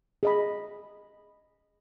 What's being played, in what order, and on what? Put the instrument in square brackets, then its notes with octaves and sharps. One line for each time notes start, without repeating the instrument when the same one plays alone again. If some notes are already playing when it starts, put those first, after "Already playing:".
[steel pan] G#4 D#5 B5